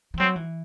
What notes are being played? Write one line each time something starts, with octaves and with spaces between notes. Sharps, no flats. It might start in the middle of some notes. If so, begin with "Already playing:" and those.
E3
F#3 C4
E3